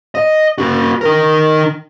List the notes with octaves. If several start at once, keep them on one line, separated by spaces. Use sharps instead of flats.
D#5
A#3 F#4
D#4 A#4